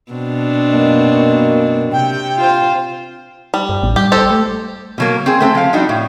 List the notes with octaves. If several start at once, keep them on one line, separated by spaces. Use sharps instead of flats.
B2 C4 D4
F#2 A#3 D#5
C3 G5
F4 C5
G3
G2
A1
G3 G4
G4 A4 C5
A3
B2 F#3 A#3
C4 G#4
A3 B3 C4 A4
F3 F5
G3 D4 D#4 F#4
A2